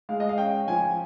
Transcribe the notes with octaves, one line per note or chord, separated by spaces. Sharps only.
G#3 F5
D#5
F5
C#4 G5
F3 G#5